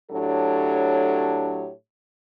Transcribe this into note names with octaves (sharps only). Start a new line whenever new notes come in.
A2 F#3 D4 G4 A4 C#5